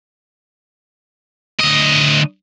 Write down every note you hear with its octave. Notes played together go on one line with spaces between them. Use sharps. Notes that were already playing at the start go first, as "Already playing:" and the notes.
D2 D#5